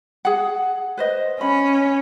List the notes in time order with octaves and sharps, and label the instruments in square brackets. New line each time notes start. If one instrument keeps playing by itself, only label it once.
[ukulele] G#4 F#5
B4 C5 D#5
[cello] C#4 [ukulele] B5